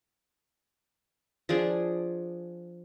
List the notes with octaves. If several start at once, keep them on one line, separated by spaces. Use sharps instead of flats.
F3 D4 G#4